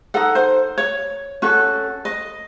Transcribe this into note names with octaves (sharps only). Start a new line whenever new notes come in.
D#4 A4 F#5
C5
C#5
C#4 F#4 A4
D#5